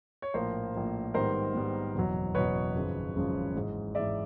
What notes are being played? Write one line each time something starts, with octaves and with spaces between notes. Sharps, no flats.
C#5
A#1 A2 F3 A#3 A#4 C5
A#1 A2 F3 A#3
G#2 D#3 G3 B3 A#4 C5
G#2 D#3 G3 B3
F#1 E2 B2 F#3
F#1 E2 B2 F#3 B4 C#5
G#1 F#2 C#3 F3 G#3
G#1 F#2 C#3 F3 G#3
G#2 E3 G#3
G#2 E3 G#3 D5 E5